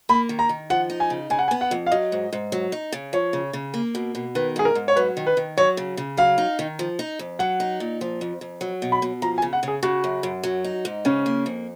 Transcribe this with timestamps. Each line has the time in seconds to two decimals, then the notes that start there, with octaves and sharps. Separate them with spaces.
0.09 A#3 B5
0.29 D#3
0.39 A#5
0.49 D#3
0.70 F3 F#5
0.90 D#4
1.00 G#5
1.10 C#3
1.30 C#3 G#5
1.39 F#5
1.48 G#5
1.51 B3
1.61 F#5
1.71 F2
1.87 F5
1.92 F#3 D#5
2.12 G#2
2.33 G#2
2.52 F#3
2.72 D#4
2.92 C#3
3.13 F3 C#5
3.33 C#3
3.53 C#3
3.74 A#3
3.95 B2
4.15 B2
4.35 D#3 B4
4.56 G#2 G#4
4.65 A#4
4.75 G#2
4.88 C#5
4.96 F#3 B4
5.17 D#3
5.27 B4
5.37 D#3
5.58 F#3 C#5
5.77 C#3
5.97 C#3
6.17 F#3 F5
6.38 D#4
6.59 D#3
6.79 F3
6.99 D#4
7.19 F2
7.39 F#3 F#5
7.60 D#4
7.80 A#2
8.01 F3
8.21 F2
8.41 F2
8.61 F#3
8.82 B2
8.92 B5
9.02 B2
9.22 F3 A#5
9.38 G#5
9.42 C#3
9.53 F#5
9.63 C#3
9.68 G#4
9.83 C#3 F#4
10.04 F#2
10.23 F#2
10.43 F#3
10.64 D#4
10.85 G#2
11.05 C#3 C#4
11.26 A#3
11.46 F2